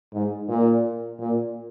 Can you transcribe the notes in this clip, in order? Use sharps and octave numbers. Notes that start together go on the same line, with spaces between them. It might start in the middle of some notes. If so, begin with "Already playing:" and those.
G#2
A#2
A#2